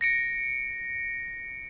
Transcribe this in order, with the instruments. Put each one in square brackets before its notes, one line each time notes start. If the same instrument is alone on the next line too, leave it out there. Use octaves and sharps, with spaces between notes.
[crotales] A#6 C#7 D7